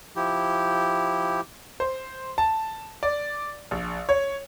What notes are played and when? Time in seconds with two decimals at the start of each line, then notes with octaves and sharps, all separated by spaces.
0.16 F3 E4 G4
1.80 C5
2.38 A5
3.03 D5
3.71 A#1
4.09 C#5